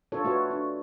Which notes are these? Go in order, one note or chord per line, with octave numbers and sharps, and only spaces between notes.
D4 F4 A4 C#5
A3 F#4 B4 C#5
D4